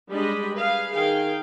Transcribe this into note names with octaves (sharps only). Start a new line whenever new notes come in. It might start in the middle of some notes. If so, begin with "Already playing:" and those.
G3 G#3 D4 G4 D#5 B5
G#4 B4 F5
D#3 G#4 F5 G5